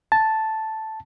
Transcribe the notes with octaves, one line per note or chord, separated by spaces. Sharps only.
A5